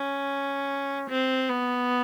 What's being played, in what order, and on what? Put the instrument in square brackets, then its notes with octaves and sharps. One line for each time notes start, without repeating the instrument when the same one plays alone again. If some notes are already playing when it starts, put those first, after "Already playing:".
Already playing: [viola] C#4
C4
B3